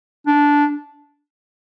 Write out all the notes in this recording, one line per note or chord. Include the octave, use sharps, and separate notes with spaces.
D4